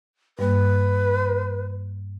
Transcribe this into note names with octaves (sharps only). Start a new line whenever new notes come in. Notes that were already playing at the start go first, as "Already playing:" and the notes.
G2 G3 A#3 B4